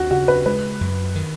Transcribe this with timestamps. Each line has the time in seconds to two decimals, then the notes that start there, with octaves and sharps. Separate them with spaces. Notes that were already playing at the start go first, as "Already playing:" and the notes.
Already playing: D#2 F#4
0.11 C#3 F#4
0.28 B4
0.46 G#3 B4
0.81 F#2
1.16 D#3